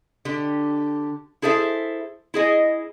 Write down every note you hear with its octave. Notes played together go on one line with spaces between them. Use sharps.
D3 G4
E4 G#4 A4 C5 E5
E4 G#4 D#5